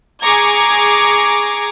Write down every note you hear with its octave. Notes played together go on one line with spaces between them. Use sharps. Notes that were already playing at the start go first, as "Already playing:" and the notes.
G#4 A#5 C#6 D6 G#6